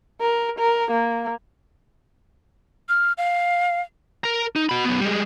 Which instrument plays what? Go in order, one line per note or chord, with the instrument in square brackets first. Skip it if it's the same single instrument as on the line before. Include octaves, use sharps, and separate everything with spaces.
[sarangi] A#4
A#4
A#3
[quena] F6
F5
[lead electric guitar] A#4 A#5
D#4
F#4 B5
F#2 B3
G3 G#3